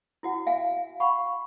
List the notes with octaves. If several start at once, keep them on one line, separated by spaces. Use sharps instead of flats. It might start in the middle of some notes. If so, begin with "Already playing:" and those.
E4 F#4 F#5
E5 F5 G#5
F5 F#5 B5 C#6